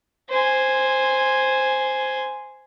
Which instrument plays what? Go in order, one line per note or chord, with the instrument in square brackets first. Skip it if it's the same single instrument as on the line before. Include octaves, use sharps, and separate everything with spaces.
[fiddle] C5 G#5